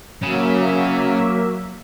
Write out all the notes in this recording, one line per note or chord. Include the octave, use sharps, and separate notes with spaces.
C#3 F#3 A#3 E5